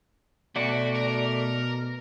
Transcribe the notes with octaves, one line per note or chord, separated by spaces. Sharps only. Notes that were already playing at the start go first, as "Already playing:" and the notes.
B2 A3 F#4 D5
A#4